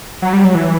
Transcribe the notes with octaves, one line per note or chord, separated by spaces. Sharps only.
F#3
G3
F#3
E3